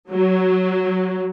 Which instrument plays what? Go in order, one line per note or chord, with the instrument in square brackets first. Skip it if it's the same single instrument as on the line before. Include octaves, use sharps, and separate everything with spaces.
[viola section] F#3